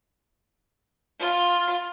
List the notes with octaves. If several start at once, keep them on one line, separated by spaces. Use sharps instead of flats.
F4